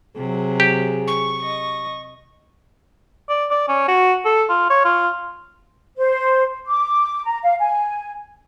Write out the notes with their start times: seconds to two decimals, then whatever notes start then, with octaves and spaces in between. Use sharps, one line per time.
0.16 C3 F#3 G#4
0.60 G4
1.07 C#6
1.41 D#5
3.29 D5
3.51 D5
3.68 C#4
3.88 F#4
4.25 A4
4.49 F4
4.70 C#5
4.85 F4
5.98 C5
6.67 D6
7.25 A#5
7.43 F5
7.60 G#5